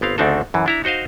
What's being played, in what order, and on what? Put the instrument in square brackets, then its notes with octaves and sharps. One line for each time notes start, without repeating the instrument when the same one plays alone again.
[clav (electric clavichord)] G1 B3 C4 F5
D2 C#3 C4 D4 D#4 A4
F#2 E3
D4 E4 A#5
D#4 F#4 C5 D#5 F5